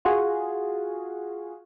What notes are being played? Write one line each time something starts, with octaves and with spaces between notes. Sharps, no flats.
F4 F#4 G#4